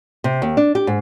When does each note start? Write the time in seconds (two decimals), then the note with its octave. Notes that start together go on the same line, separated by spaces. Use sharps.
0.24 C3
0.42 D#2
0.57 D4
0.75 G4
0.87 G#2